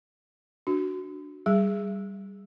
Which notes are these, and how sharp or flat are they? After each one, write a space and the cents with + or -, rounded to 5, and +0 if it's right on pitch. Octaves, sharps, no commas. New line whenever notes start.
D4 +0 F#4 +0
G3 -5 G#4 +0